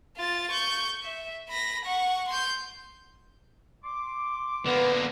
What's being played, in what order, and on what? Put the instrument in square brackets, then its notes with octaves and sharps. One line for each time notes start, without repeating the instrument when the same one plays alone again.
[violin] F4 A6
C#6 G6
E5
B5 A#6
F#5 C#6
C6 G6
[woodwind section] C6 D6
[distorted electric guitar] D3 A#3 [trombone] B3